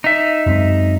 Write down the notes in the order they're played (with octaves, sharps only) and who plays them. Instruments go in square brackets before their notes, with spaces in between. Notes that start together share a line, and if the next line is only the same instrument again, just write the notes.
[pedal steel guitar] D#4 E5
[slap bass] F#2 G#3 C4